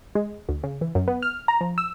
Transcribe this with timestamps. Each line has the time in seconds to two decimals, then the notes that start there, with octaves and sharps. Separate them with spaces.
0.15 G#3
0.49 D2
0.63 C#3
0.81 E3
0.95 F#2
1.08 B3
1.23 F6
1.48 A#5
1.61 F3
1.78 E6